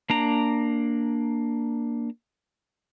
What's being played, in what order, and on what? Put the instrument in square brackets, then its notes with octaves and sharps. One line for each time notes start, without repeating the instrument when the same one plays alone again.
[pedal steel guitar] A#3 D4 A#5